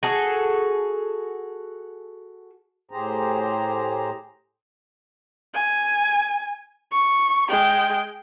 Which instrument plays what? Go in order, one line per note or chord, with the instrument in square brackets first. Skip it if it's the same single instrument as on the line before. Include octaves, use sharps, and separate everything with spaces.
[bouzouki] F#4 G#4 A4
[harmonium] A2 G4 G#4 C5 A#5
[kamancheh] G#5
C#6
G#3 G5